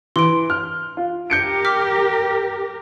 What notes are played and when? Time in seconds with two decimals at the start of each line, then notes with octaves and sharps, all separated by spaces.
0.16 E3 C6 D7
0.50 F6 F#6
0.97 F4
1.30 G4 A#4 G6 C#7 D7
1.65 D6 F6 B6